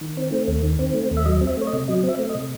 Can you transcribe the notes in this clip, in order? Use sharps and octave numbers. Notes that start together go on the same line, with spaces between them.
D#3
C4
A3
D#2
D#3
C4
A3
D#2
E5
F#3 D#5
C4
E5
A3 C#5
D#5
C3
F#3 D#5
C4
E5
A3
D#5
C3